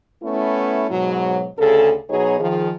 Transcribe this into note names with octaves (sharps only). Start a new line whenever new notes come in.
A3 B3 C#4 E4
G#2 B2 F#3
D2 C#3 G#4 A4
B2 F#3 B3 D#4 G#4 C#5
D#3 F3 G#4